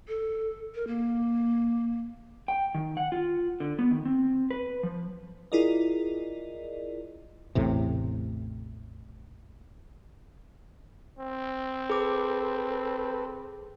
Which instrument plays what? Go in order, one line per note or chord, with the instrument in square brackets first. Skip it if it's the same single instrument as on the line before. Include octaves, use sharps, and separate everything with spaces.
[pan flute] A4
A#4
A#3
[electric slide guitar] G5
D#3
F#5
F4
D3
B3
D#3
C4
B4
F3
[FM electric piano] E4 F4 G#4 A#4 D5 D#5
[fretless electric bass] A1 E2 A2 C3
[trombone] C4
[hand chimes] G#4 D6 [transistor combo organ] A4 B4